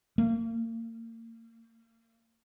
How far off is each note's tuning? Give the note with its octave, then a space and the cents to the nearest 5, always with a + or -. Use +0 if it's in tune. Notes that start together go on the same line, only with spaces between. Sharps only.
A#3 -35